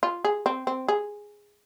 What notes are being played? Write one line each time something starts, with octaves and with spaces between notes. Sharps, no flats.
F4
G#4
C4
C4
G#4